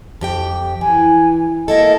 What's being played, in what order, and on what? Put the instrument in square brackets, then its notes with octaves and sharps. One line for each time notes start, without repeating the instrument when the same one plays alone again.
[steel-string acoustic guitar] F2 G4 G5
[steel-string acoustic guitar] E3 [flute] G#5
[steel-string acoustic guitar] A#3 E4 A4 [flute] D#5